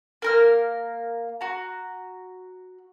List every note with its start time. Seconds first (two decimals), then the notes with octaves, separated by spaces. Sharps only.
0.22 A#3 A#4 F6
1.41 F#4 A#5